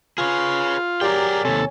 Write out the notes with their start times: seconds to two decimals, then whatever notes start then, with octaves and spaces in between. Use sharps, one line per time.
0.18 F4 G#4 B4 C#5
1.01 F#3 G4 G#4 A#4 D5 G5
1.45 D#2 C3 A4 C#5 G#5